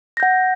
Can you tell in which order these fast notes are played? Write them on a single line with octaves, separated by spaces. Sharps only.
A#6 G6 F#5